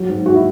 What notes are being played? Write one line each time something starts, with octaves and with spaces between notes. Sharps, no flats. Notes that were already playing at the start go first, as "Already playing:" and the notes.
Already playing: F#3
G#2
F#4
E4